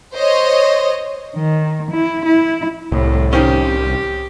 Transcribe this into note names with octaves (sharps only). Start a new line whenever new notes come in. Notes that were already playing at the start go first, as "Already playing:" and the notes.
C5 C#5 D#5
D#3
E4
E4
C2 A2
D#3 C4 C#4 G4